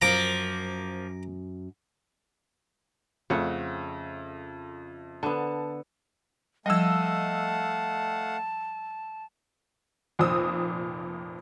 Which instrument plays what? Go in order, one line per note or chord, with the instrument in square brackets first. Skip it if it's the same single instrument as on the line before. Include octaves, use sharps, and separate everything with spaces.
[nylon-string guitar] F#2 [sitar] F3 A#3 [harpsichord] A#5 D6
[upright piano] F2 A3 [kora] C#3 F#5
[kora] D3 B3 [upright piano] A5
[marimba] F3 G3 [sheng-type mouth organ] A3 F5 F#5 [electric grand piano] D#5 E6 [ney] A5
[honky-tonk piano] F1 F2 A#2 C5 D#6 E6